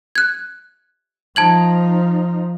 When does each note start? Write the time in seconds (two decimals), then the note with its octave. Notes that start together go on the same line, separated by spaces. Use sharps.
0.15 F#6 G#6
1.36 F3 D#4 A5 G#6 F#7